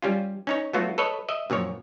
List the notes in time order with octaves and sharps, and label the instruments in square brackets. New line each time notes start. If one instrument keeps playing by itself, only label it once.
[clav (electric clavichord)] G3 C#4 F4
C#4 D#4 C#5
F#3 A3 B3 F4 F#4
A4 B4 C#5 D#5
D#5 E5
F#2 A#2 F3 C#5